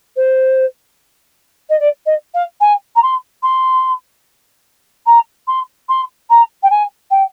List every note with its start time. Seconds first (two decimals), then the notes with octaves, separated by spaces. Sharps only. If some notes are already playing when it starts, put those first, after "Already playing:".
0.16 C5
1.69 D#5
1.80 D5
2.06 D#5
2.34 F5
2.61 G#5
2.96 A#5
3.03 C6
3.43 C6
5.06 A#5
5.47 C6
5.89 C6
6.30 A#5
6.63 G5
6.70 G#5
7.11 G5